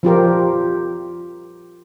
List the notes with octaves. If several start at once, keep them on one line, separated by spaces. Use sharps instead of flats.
F3 F4 G4 A#4